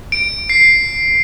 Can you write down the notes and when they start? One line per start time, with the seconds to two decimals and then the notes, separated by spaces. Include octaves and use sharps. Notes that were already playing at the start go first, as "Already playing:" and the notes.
0.12 D7
0.49 C7